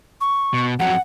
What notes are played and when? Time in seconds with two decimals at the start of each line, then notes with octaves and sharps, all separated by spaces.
0.21 C#6
0.54 B2
0.79 F2 F#3 F#5